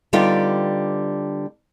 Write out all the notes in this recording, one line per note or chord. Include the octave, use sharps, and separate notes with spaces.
D3 G3 B3 D#4 F4 G4